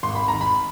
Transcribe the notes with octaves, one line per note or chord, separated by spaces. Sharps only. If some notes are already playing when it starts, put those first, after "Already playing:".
G#1 C6
B5
D#3 A#5
B5